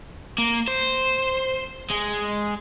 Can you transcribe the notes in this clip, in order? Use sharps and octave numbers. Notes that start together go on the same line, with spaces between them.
A#3
C5
G#3